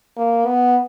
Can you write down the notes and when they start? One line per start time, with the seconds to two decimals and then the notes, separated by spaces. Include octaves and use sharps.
0.17 A#3
0.46 B3